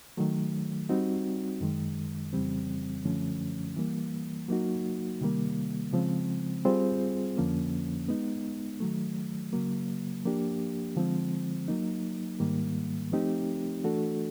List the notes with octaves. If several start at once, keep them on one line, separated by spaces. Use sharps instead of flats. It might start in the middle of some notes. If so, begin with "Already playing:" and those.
D#3 F#3 A3
G3 C4 D#4 F#4
F#2 D#3 G#3
F2 C#3 E3 G3 C4
F#2 D3 F3 A3 C#4
E3 G3 A#3
F#3 A#3 D#4 F#4
C3 D#3 G3 A#3
C#3 F3 G#3 C4
G3 C4 F4 G#4 C5
F2 D3 F3 A#3 C#4
G#3 B3 D#4
D#3 F#3 A3
C#3 F#3 A#3
F3 A#3 D4 G4
D3 F3 G#3 C4
F#3 A#3 D#4
G#2 D#3 G3 A#3
F3 A3 C4 D#4 G4
E3 A3 D4 F#4 A4